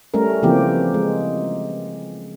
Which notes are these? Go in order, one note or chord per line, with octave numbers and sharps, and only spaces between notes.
G3 A3 C#4 A#4
C#3 E3 F3 A#3 C4 G4
G#3